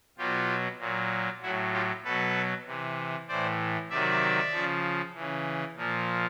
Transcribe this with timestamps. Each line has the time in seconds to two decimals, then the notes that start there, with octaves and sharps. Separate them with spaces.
0.18 B2 F#3 F4 G4
0.79 A#2 F#3
1.42 A2 F#3 E4 F#4
1.72 F4 G4
2.04 B2 F#3 A4 B4
2.66 C3 E3
3.28 A2 E3 C5 D5
3.90 C3 D#3 F#3 D5 E5
4.52 C#3 F3
5.14 C#3 E3
5.76 A#2 F3